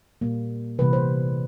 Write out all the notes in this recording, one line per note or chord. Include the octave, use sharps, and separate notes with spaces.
A#2 G3 A#3
C3 E3 G3 A#3 B4
C5